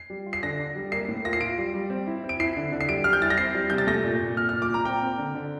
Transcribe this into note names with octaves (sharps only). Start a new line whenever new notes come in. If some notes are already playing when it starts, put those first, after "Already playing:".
Already playing: C7
G3
F4
C7
D3 A#6
D4
G3
A#3 C7
A2
F4 A#6
C7
F4 D7
G3
G3
C4
E4
C4
D7
E4 C7
D3
D3
C7
G3 D7
G3 F6
G6
E4 A6
A#6
C4 C7
G3
C3 G6
A6
A3 A#6
A#2
A#2
A#2 F6
A#2 F6
D6
A#2 A#5
C4 G5
C4
D3
D3